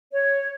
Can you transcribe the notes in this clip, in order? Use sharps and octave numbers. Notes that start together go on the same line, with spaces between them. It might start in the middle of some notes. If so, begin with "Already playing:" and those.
C#5